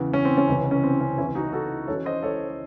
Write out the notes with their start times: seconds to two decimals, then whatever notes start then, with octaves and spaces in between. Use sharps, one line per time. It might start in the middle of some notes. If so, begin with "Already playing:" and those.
Already playing: E2 C#3 E3
0.13 C#4
0.25 C4
0.38 C#4
0.48 C#2 C3 E3
0.71 C#4
0.83 C4
1.01 C#4
1.18 C#2 C#3 E3 C#4 E4
1.35 D#4 F#4
1.53 F#4 A4
1.87 C#2 C#3 E3 A4 C#5
2.05 C5 D#5
2.22 A4 C#5